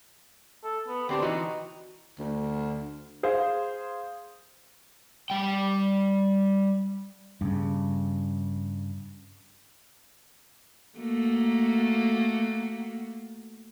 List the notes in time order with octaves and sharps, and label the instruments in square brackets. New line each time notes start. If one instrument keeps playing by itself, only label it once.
[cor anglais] A4
B3
[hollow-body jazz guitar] D2 C4 D4 [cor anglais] G4
[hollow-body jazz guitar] E3 F#4 [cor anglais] D#4
[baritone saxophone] D2
[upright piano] G#4 C5 F5
[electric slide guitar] G3 G5
[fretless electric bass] G2 C#3
[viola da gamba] A3 A#3 F#4